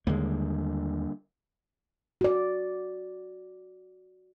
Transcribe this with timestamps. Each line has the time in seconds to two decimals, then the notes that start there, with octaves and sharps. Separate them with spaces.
0.07 D#2 D3 G3 G#3 A#3
2.21 F#4 D5